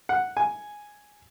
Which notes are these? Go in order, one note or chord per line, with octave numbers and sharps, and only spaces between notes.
F#5
G#5